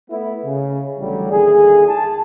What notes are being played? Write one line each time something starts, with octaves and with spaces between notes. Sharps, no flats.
A3 B3 E4
C#3
A1 D3 E3 F#3 G3
D#2 D3 E4 G#4
A5